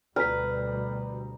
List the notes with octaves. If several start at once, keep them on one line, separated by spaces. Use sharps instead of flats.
D2 B2 G3 B4 A#5 F6 B6